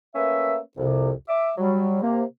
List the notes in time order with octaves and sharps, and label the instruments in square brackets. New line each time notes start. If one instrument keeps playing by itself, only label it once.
[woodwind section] A3 A#3 C#4 B4 E5
C2 F2 C3
E5 D6
F#3 G3
C3 A#3